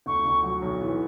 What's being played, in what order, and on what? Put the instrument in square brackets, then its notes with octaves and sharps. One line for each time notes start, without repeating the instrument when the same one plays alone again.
[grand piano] D2 [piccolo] C#6
[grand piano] D2
F#3
B1
E3